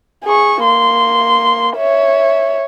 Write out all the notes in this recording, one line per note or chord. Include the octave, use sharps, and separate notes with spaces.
G#4 C#6
A#3 C6
C#5 E5